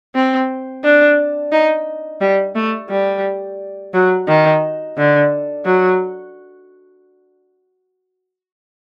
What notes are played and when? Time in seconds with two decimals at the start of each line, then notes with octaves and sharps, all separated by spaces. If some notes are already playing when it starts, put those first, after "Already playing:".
0.15 C4
0.84 D4
1.52 D#4
2.21 G3
2.56 A3
2.90 G3
3.94 F#3
4.28 D#3
4.97 D3
5.65 F#3